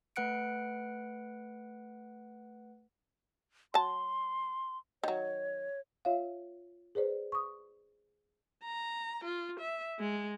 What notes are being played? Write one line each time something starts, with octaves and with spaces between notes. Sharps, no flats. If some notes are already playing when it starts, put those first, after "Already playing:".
A3 B4 F#5 F#6 C#7 D7
F#3 A5 C6
D#3 F#3 C#5
F4 C#5 E5 F5
G#4 B4 C5 D5
C#6 D#6
A#5
F4
E5
G#3